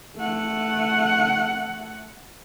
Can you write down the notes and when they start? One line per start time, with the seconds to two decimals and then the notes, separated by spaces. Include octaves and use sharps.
0.16 A3 F#5